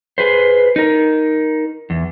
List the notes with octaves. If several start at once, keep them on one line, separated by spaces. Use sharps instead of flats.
G#4 B4 C5
D#4 A#4
E2